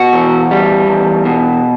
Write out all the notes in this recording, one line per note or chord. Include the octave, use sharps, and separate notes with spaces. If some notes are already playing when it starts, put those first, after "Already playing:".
Already playing: B2 F#4
E2
G3
E2
B2